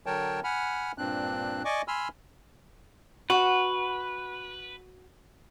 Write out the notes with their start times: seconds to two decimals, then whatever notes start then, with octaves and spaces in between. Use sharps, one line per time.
0.06 D3 F#3 A#4 C#5 G5 A5
0.44 F#5 G#5 B5 F6
0.98 G2 A#2 C4 D4 F#6
1.65 D5 D#5 G#5 C#6 D6
1.88 G#5 B5 C6 E6 F6
3.30 F#4 B4